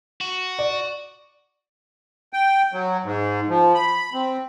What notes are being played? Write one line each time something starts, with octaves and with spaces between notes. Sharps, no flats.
F#4
D5
G5
F#3
G#2
F3
B5
C4